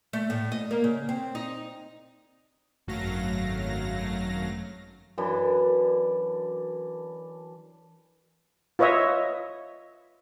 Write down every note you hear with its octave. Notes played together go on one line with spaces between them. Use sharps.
A3
A2
D#5
A#3
C#3
C4
D#4
G#1 F#2 F#3 A3 F5 A#6
F#2 E3 D4
F4 B4 C#5 D#5 E5